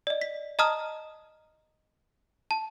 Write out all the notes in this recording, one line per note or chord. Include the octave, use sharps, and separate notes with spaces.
D5 D#5
B6
D#5 A5 A#5 D#6 F6
A5